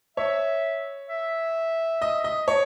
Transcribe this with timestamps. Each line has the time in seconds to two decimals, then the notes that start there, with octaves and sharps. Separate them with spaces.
0.17 C#5 E5
1.09 E5
2.02 D#5
2.24 D#5
2.48 C#5